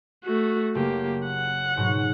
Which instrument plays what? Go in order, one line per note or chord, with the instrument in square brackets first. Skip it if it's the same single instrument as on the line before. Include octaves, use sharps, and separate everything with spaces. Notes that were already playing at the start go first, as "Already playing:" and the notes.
[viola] A3 F#4
[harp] F#1 [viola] A#3 G4
[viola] F#5
[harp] G#2 B2 F#3